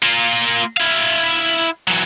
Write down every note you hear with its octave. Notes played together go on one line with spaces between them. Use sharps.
A#3 F4
E4 F5
E3 F#3